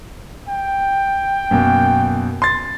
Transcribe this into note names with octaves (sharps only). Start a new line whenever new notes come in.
G5
F#2 B2 A#3
C6 A6